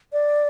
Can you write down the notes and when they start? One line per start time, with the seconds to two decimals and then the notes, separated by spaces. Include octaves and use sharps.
0.13 D5